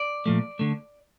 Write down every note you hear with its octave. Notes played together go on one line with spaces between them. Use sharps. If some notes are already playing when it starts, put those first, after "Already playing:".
Already playing: D5
A#2 F3 A3
D3 A3